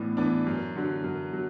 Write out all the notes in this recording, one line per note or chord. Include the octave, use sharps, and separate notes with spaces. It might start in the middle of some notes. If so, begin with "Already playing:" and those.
Already playing: A2 E3 B3 D4
E3 B3 D4
F#2
D3 F#3
F#2
F#3